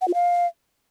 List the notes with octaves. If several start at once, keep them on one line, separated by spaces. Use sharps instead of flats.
F#5
F4
F5